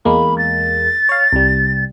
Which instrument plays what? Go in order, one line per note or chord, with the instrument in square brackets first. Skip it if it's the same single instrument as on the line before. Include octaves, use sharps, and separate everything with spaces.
[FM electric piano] E2 G#3 A#3 [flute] B5
[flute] A6
[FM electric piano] C#5 F5
C2 G3